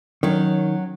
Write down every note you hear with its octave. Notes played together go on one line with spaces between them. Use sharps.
D#3 F#3 C#4